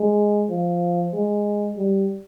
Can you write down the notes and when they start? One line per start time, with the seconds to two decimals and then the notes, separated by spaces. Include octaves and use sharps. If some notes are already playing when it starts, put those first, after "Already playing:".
Already playing: G#3
0.50 F3
1.13 G#3
1.77 G3